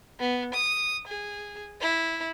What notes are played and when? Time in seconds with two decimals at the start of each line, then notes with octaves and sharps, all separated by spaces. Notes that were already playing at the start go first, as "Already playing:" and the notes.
0.20 B3
0.54 D#6
1.07 G#4
1.81 E4